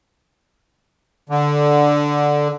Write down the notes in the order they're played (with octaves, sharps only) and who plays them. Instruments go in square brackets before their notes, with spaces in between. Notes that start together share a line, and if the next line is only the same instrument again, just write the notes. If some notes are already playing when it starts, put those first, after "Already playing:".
[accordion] D3